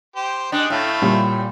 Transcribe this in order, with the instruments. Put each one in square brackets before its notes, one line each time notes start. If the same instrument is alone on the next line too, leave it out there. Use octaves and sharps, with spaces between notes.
[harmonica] G4 C5
[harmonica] G#3 D#4 G4 [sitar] D4
[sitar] A2 [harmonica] A3 F5
[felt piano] A#2 G3